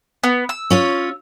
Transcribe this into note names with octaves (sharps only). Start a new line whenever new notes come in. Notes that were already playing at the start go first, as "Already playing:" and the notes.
B3
E6
C#4 F4 C#5